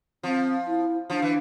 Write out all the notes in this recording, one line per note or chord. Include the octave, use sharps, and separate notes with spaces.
F3 C4
E4
F3 D4
E3